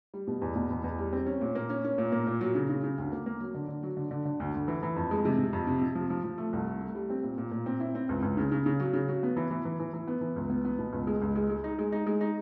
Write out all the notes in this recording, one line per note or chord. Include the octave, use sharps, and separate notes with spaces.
G3
B2
E2
B2
E2
E2
G3
C4
C#4
A#2
A#3
C#4
C#4
A#2
A#3
A#2
F#3
C#3
C#3
C#3
D2
A#3
A#3
F#3
D3
D3
F#3
D3
D3
D3
D2
D2
E3
E3
F2
G#3
C3
C3
F2
C3
C3
F3
F3
F3
A3
C2
A3
A3
G3
C4
A#2
A#2
A#2
C4
E4
C4
C#2
C#2
C#3
C#3
C#3
F#3
C#3
F#3
B3
E3
E3
E3
E3
E3
B3
E3
C#2
B3
B3
B2
C#2
G#3
C#2
G#3
G#3
D#4
G#3
D#4
G#3
D#4